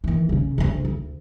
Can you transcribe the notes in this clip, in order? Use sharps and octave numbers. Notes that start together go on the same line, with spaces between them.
D#3 E3
C#3 C#4
D2 C#3
D2